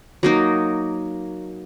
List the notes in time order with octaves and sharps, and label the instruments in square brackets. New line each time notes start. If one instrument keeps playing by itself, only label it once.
[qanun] F#3 A#3 D#4